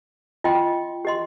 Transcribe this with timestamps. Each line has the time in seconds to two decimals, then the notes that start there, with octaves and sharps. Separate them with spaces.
0.44 F4 D#5 G5 C6
1.05 G4 D#5 C6